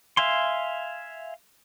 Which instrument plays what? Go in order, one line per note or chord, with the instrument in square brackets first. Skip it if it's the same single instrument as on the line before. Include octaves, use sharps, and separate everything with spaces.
[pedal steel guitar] E5 F5 G#5 C6